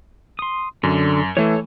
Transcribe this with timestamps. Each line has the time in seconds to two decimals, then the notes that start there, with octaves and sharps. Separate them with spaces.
0.39 C6 D#6
0.83 F#2 D3
1.37 E3 A3 A4 C#5